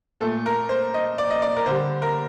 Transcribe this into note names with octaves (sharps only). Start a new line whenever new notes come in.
A#2 A3 A4
A#4
C5
D#5
D5
D#5
D5
A#4
D3 G3 C5
A#4